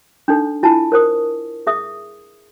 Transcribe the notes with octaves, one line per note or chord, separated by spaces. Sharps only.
D4 D#4 A4
E4 F4 G#5 A5
A#4 C5 D#6
G#4 E5 D#6